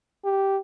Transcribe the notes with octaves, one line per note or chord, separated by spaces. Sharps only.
G4